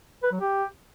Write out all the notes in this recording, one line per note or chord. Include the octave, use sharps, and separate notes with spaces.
B4
F#3
G4